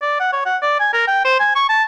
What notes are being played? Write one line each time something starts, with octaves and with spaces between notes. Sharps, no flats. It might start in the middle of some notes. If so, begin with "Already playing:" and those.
D5
F#5
C#5
F#5
D5
G#5
A#4
G5
C5
G#5
C#6
A5